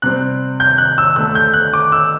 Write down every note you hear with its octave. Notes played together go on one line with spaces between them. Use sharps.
C3 G3 C4 F#6
G6
F#6
E6
D2 D3 A3 E6
G6
F#6
D6
E6